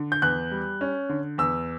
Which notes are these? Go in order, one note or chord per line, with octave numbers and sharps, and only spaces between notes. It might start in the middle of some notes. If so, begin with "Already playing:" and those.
Already playing: D3
G6
E2 F#6
G3
C#4
D3
E2 E6